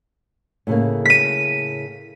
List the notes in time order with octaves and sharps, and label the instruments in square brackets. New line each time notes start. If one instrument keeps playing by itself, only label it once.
[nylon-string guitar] A2 C#3 A#3
[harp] B6 D#7